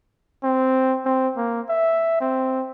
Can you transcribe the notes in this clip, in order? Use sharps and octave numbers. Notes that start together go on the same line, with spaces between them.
C4
C4
A#3
E5
C4